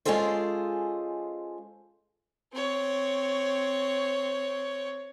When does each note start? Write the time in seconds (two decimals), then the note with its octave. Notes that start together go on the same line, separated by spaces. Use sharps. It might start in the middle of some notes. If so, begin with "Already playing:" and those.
0.05 G#3 C#4 F4 G#4 A4 C5
2.53 C4 C#5